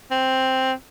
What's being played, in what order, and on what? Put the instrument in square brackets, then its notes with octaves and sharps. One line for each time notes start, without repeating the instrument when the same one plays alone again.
[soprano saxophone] C4